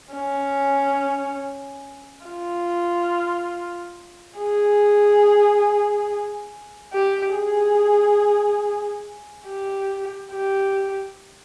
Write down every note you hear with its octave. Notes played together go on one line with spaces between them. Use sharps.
C#4
F4
G#4
G4
G#4
G4
G4